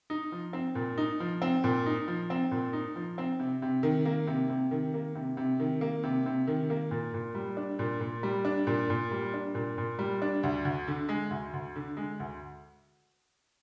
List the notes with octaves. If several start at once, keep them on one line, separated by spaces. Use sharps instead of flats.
D#4
F3
C4
A#2
D#4
F3
C4
A#2
D#4
F3
C4
A#2
D#4
F3
C4
C3
C3
D#3
A#3
C3
C3
D#3
A#3
C3
C3
D#3
A#3
C3
C3
D#3
A#3
A#2
A#2
G3
D4
A#2
A#2
G3
D4
A#2
A#2
G3
D4
A#2
A#2
G3
D4
D2
D2
D3
G#3
D2
D2
D3
G#3
D2